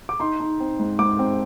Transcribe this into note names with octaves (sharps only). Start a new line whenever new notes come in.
D6
D#4 C6
D#4
C4
G#2
G#2 D6
C4